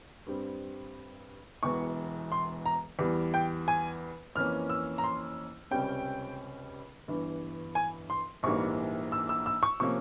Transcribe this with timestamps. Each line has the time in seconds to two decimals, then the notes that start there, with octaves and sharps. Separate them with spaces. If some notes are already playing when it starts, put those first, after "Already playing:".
0.27 G2 G3 C4
1.63 E1 E2 E3 C#6
2.32 C6
2.66 A#5
2.99 E2 E3 G3
3.34 G5
3.68 G#5
4.35 F2 E3 A#3 C#4 F6
4.70 E6
4.98 A#5
5.04 C6
5.71 C#2 C3 G3 C#4 G5
7.08 G1 G2 E3
7.75 G#5
8.10 C6
8.43 A#1 G#2 E3 G3 A#3 C#6
9.12 E6
9.29 E6
9.46 E6
9.63 C#6
9.80 C3 F3 A#3 C#4 C#6